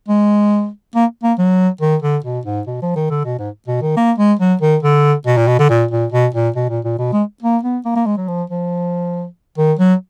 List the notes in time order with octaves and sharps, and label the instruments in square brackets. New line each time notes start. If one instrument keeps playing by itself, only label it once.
[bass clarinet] G#3
A#3
A#3
F#3
D#3
D3
B2
G#2
B2
F3
D#3
D3
B2
G#2
B2
D#3
A#3
G#3
F#3
D#3
D3
B2
A#2
B2
D3
A#2
A#2
B2
A#2
B2
A#2
A#2
B2
G#3
A#3
B3
A#3
A#3
G#3
F#3
F3
F3
D#3
F#3